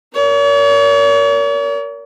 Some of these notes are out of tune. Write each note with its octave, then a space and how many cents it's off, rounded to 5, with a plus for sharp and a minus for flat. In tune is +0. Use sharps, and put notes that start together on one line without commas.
A#4 +0 C#5 +45